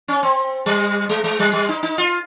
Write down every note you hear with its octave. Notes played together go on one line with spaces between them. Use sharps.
C#4
C4
G3
G#3
G#3
G3
G3
D#4
D#4
F4